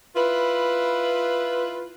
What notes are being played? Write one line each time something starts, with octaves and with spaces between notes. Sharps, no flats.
E4 F4 B4